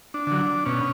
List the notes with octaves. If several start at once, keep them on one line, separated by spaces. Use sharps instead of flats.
D4
D3 F#3
D4
B2 C#4